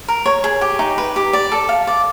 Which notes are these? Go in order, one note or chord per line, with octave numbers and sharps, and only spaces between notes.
A#4
C#5
G#4
G4
D#4
B4
G4
D5
A4
F5
D5